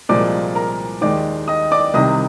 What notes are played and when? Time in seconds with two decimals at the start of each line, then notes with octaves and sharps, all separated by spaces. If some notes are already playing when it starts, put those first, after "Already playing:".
0.09 C2 A#2 F3 G#3 D5 D6
0.55 A#4 A#5
1.01 D#2 D#3 G#3 D5 D6
1.48 D#5 D#6
1.71 D5 D6
1.94 C2 C3 D#3 D#5 D#6